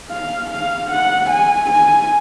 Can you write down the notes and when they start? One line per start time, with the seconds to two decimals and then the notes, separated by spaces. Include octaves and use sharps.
0.10 F5
0.50 F5
0.90 F#5
1.30 G#5
1.70 G#5